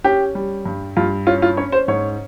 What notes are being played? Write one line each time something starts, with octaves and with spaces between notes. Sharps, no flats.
C#4 G4
G3
G2
G2 F4
C#4 F4
F4
C#4 C#5
C5
G#2 C#5